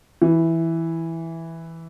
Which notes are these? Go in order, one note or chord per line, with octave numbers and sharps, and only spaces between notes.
E3